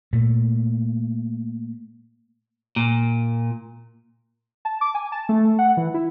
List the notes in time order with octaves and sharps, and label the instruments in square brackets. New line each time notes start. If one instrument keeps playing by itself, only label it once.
[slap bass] A#2 A3
[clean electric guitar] A#2
[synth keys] A5
D6
G#5
A5
A3
F#5
E3
E4